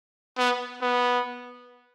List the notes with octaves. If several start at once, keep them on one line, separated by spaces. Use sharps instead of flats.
B3
B3